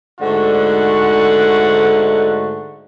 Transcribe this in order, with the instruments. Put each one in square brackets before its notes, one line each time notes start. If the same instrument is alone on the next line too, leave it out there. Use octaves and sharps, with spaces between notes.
[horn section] G#2 D3 A3 F#4 F#5